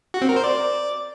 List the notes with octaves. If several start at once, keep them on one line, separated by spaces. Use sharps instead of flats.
F#4
C4
A#4
C5
D5